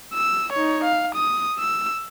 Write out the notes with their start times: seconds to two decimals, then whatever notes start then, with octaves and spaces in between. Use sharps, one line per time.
0.15 E6
0.53 D#4 C#5
0.84 F5
1.15 D#6
1.59 E6